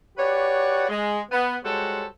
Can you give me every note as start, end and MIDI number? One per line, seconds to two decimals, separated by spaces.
0.18 0.87 66
0.18 0.87 67
0.18 0.87 71
0.18 0.87 73
0.18 0.87 74
0.18 0.87 78
0.89 1.20 56
1.32 1.57 59
1.64 2.06 55
1.64 2.06 56
1.64 2.06 66
1.64 2.06 69
1.64 2.06 72
1.64 2.06 73